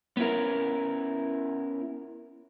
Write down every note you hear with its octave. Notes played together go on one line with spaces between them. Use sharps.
B3 C#4 E4 A#4